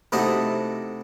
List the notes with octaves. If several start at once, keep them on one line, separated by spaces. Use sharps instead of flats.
C3 A3 D#4 E4 F#4 D#5